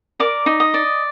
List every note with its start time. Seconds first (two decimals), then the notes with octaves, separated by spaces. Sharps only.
0.20 A#4 D5 D6
0.46 D#4
0.60 D#5
0.74 D5